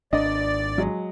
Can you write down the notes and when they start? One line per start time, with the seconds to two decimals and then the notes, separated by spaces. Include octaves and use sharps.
0.13 G#1 D4 D5 D#5
0.78 F#3 G#3